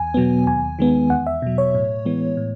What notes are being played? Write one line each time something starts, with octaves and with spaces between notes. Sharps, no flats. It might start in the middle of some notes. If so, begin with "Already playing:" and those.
Already playing: E2 G#5
B2 F#3 B3
D#2 G#5
D#3 G#3 B3
E2 F#5
E5
B2 F#3
C#5
A2
E3 G#3 B3
A2